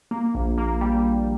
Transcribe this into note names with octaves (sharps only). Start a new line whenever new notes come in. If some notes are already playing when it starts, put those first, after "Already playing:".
A#3
A#1
A#3
G3